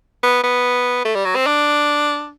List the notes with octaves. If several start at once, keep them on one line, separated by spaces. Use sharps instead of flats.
B3
B3
A3
G3
F#3
C4
D4